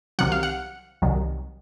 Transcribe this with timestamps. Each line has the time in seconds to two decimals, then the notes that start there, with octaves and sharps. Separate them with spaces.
0.19 C2 C3 D#3 F#3 F#5
0.32 F5
0.43 F#5
1.02 C2 C3 D#3 F#3